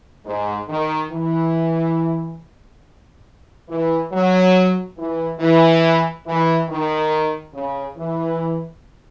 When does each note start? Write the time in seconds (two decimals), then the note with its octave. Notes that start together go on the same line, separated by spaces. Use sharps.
0.25 G#2
0.68 D#3
1.11 E3
3.68 E3
4.11 F#3
4.97 E3
5.39 E3
6.26 E3
6.68 D#3
7.53 C#3
7.97 E3